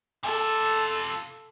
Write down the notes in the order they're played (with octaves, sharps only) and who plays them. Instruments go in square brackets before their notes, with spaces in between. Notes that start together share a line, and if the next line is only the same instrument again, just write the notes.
[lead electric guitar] C3 F4 [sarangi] A4